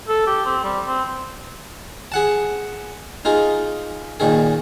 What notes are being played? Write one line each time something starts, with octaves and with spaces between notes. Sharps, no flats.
A4
G4
C4
G3
C4
G#4 F#5 A5
D#4 F4 G#4
A#2 D#3 G#4